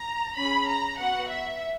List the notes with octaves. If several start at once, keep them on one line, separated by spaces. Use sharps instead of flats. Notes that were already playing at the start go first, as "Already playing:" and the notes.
Already playing: A#5
C#4 G#4 B5
A#5
B3 F#4 F#5
E5